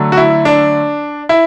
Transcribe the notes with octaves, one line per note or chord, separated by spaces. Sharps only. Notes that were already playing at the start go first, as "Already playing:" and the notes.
Already playing: D3 F#3 A3
F#4
E4
D4
E4